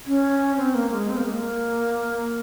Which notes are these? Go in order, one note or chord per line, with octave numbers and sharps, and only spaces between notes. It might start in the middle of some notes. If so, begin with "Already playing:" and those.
C#4
C4
A#3
G#3
C4
A#3
G#3
A#3